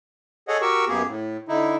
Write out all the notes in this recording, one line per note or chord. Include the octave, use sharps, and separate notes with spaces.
G#4 A4 C#5 D#5 F#5
F#4 G4 A#4 C#6 E6
F#2 A#3 B3 G4 G#4
A2
D3 D#4 E4